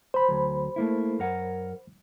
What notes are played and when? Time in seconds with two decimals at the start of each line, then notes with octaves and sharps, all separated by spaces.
0.14 C5 B5
0.28 D2 F#3
0.76 A3 A#3 E4
1.19 F#2 A#4 F#5